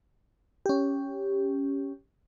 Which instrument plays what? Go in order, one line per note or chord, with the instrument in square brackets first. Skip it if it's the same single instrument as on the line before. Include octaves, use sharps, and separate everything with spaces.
[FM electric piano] C#4 G4